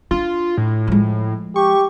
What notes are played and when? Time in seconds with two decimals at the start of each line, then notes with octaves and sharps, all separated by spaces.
0.11 D4 F4
0.57 A2
0.87 F3 G#3
1.56 G4 C#6